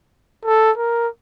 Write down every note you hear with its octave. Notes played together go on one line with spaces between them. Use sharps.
A4
A#4